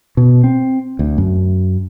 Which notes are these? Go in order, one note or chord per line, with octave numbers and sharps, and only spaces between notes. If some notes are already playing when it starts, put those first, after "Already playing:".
B2
C4
D2
F#2